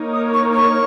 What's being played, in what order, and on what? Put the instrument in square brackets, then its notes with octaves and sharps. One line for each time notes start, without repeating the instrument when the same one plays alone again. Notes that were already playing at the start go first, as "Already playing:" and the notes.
Already playing: [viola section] A#3 D#4 A#4 C#5
[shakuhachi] D#6
C#6
C#6